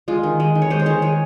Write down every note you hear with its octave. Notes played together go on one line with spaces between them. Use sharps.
G#3 F4
D#3
G#3
D#3
C#5
G#3 C5
C#5
D#3 C5
G#3 C#5